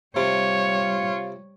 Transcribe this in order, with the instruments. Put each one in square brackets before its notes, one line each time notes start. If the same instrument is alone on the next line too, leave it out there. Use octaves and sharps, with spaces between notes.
[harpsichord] C3 [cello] G3 C#5 [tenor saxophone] F4